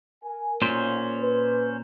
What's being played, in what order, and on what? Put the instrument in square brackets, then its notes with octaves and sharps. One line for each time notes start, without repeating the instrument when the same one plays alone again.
[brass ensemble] A#4 G#5
[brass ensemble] B1 [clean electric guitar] A#2 [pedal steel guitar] C#4 C5
[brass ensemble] B4